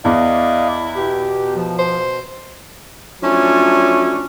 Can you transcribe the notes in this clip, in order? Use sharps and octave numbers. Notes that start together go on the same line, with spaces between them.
E2 E4 D5 D#5 F5
B2 G4
F3
C5
F3 F#3 A3 C#4 D4 E4